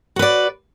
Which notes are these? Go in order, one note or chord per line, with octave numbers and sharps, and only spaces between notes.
F#4 B4 D5